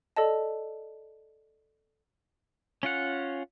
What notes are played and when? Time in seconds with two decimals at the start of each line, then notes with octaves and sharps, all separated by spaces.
0.16 A4 D5 D#5 A5
2.83 C#4 F4 F#5